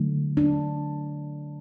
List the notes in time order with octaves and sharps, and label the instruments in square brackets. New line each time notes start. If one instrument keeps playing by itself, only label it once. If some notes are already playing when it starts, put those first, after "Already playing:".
Already playing: [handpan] D3 F#3 A3
D4